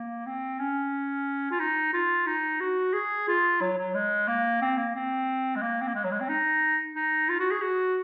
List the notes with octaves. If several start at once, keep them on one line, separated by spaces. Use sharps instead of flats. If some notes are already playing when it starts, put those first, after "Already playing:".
Already playing: A#3
C4
C#4
F4
D#4
F4
D#4
F#4
G#4
F4
F#3
F#3
G#3
A#3
C4
A#3
C4
G#3
A#3
C4
A#3
G#3
F#3
G#3
C4
D#4
D#4
F4
F#4
G#4
F#4